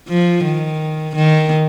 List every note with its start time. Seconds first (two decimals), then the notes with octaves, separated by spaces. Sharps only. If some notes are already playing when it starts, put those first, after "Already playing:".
0.08 F3
0.44 D#3
1.15 D#3